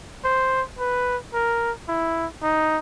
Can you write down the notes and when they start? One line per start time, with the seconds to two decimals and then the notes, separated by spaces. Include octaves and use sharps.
0.24 C5
0.79 B4
1.33 A#4
1.88 E4
2.42 D#4